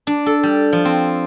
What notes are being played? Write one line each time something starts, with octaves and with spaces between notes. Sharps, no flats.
D4
A4
G3
F3
C4